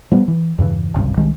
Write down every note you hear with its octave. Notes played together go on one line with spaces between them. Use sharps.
F3 G3 B3
E3
E2 G2 C#3 E3
G#1 C#2 G2 C3
C2 D#3 G#3